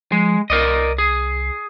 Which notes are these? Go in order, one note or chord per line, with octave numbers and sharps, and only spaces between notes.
F3 G#3
C2 A#4 D5 D#5
G#4